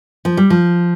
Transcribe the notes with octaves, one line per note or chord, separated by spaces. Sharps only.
F3
G3
F3